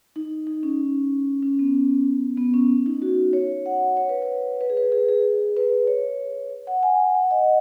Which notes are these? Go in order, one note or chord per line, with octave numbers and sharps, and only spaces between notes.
D#4
D#4
C#4
C#4
B3
B3
C#4
D#4
F#4
C#5
F#5
C#5
B4
C#5
B4
G#4
B4
G#4
G#4
B4
C#5
F#5
G#5
F#5
D#5